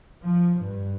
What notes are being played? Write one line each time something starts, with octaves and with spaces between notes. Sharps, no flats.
F3
G2